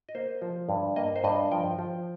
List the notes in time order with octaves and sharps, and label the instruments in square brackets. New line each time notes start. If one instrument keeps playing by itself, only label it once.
[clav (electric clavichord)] D#5
A#3 C5
F3
G2
A#3 D#5
C5
G2 D#5
F3 G5
F3